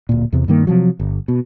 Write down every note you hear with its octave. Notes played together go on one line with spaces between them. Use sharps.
D1 A#2
E2 C3
G2 D#3 A#3
C3 F3 F#3
G1
B2